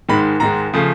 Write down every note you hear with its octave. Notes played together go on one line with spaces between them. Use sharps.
G#2 D#3 G#3 B5
G#2 D#3 G#3 A#5
C#3 F3 A3